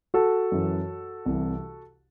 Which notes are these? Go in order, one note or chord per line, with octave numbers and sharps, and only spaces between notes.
F#4 A4
F#2 E3
C2 C3 E3